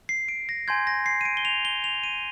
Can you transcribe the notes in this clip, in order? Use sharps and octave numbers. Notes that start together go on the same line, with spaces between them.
C7
D7
A#6
G#5 C6 G6 G#6
A#6
C7
D#7
D7
G7
F7
G7
F7
D#7